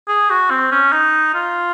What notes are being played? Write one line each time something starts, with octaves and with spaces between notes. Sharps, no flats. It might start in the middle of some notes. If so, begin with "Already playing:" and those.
G#4
F#4
C4
C#4
D#4
F4